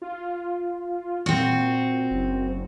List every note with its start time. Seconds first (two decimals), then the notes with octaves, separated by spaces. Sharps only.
0.02 F4
1.26 A#2 C4 F#4
2.11 F#1